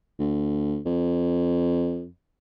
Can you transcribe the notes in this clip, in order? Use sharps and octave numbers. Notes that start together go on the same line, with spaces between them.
D2
F2